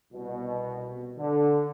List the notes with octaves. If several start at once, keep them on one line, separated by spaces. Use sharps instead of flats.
C2 B2
D3